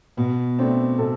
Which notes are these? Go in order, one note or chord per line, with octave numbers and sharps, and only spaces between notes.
B2 B3
A3 C4 D4
B2 A4